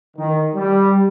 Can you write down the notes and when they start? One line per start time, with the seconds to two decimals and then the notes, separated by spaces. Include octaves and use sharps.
0.17 D#3
0.55 G3